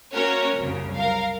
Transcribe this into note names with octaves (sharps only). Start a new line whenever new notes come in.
A#3 C#4 F#4 A#4 C#5
C2 F#2 C#3
A#4 F5